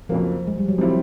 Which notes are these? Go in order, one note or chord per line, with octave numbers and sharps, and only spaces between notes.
F2 C#3 F3 F#3 A#3
G#3
G3
F#3
C3 D#3 F3 G3 C4 E4